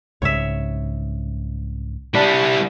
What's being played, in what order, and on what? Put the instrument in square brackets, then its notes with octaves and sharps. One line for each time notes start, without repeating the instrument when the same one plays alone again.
[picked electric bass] C2 G#2 C#3 [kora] C#5 E5
[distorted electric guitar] G3 E4 [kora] D4